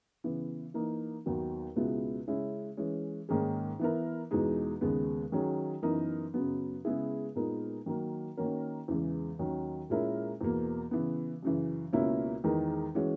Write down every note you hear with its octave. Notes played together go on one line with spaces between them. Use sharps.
C#3 E3 B3
E3 A#3 D#4
D#2 D#3 F#3 B3 F#4
C#2 B2 G#3 B3 E4
C#3 G#3 C#4 E4
E3 G#3 C#4
G#2 D#3 A#3 C#4 G#4
E3 B3 E4 A#4
E2 B2 G#3 D#4
D#2 C#3 G#3 B3
D#3 F#3 C#4 G#4
F#2 E3 B3 D#4 A#4
F#2 C#3 F#3 B3
C#3 G#3 B3 E4 G#4
A#2 G#3 B3 D#4 A#4
D#3 F#3 A#3
D#3 A#3 C#4 F#4 A#4
E2 C#3 E3 G#3
D#2 D#3 F#3 C#4
A#2 G#3 C#4 E4 A#4
E2 B2 A#3
C#3 E3 B3
F#2 C#3 E3
C#2 B2 A#3 C#4 E4
E2 D#3 G#3 D#4 A#4
E3 G#3 C#4 F#4